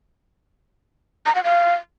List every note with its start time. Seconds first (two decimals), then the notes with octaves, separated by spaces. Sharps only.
1.26 A#5
1.35 F#5
1.44 F5